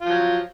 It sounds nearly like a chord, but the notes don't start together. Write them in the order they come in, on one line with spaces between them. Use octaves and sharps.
F4 F3 F#3